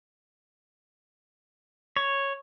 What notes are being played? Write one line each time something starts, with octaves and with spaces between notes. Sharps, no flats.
C#5